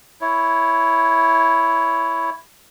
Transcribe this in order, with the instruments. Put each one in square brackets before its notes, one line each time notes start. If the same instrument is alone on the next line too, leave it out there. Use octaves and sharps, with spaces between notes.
[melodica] E4 C#5